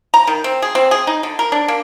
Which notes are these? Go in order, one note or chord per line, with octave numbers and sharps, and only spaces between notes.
A#5
D#3
C4
G#4
C4
G#4
D#4
D3
A#4
D4
A#3